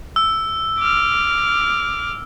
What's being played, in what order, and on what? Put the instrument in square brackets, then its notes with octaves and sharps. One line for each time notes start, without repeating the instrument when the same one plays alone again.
[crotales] E6
[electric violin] D6 F6